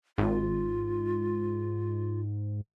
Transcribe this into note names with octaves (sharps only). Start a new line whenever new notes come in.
G#1 G#2 F4